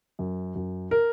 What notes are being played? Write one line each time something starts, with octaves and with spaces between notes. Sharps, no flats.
F#2
F#2
A#4